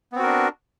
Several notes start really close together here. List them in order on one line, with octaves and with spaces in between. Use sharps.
B3 C4 F#4 A#4 D4